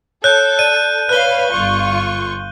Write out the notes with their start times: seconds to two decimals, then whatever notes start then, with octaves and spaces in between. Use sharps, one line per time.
0.24 A4 C#5 F#6 G6
0.59 D5 D#7
1.09 B4 C#5 F5 F#6 G7
1.52 G1 F4 C#6